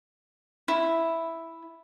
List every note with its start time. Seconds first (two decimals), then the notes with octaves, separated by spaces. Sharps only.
0.68 E4